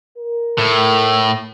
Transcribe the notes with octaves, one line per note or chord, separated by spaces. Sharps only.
A#4
A2